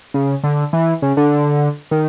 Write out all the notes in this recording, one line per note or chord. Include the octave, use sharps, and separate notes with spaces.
C#3
D3
E3
C#3
D3
D#3